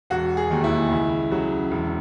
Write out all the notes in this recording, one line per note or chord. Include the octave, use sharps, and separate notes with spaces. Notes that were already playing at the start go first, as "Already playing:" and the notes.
E1 F#4
G#4
D#2 D#3
E4
C#2
C#3 F#3
E1